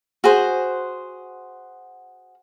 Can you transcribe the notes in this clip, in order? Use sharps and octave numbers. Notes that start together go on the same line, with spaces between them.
F#4 G#4 C5